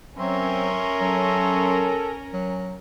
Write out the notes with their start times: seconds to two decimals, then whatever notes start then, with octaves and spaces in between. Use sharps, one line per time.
0.18 F#3 C4 C#4 A#4 C#5 E5 C6
1.01 F#3 A4
2.33 F#3